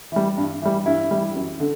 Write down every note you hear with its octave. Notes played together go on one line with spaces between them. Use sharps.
E3 G3
G2
E3 G3
G2 E4
E3 G3
F#2
D3